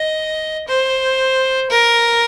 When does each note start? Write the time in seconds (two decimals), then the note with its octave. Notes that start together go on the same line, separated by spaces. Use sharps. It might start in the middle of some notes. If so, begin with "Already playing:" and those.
Already playing: D#5
0.67 C5
1.70 A#4